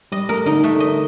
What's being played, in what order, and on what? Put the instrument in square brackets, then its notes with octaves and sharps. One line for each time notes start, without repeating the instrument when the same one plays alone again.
[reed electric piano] G3 [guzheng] D#5
[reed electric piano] A3 [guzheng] A#4
[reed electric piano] D3 [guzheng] D#4
[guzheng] A3
D#5